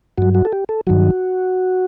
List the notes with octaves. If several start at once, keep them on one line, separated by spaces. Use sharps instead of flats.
G2 F#3 F#4
F#4
A4
G4
A4
G2 D#3 F#3 F#4